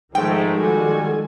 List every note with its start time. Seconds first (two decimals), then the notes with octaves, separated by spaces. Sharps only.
0.15 G#2 D#3 F3 G#3 A3 G5
0.57 G3 F#4 A4 G#5